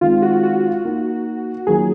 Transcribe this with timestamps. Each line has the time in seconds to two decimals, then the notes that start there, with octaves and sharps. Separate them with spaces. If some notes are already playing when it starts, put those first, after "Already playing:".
0.01 D#3 G#3 C4 F4
0.22 F#4
0.43 F#4
0.85 A#3 D#4 A#4
1.67 D#3 F#3 A#3 F4 G#4 A#4